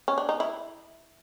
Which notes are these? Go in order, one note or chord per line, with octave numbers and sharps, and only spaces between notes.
C#4
D4
D#4
E4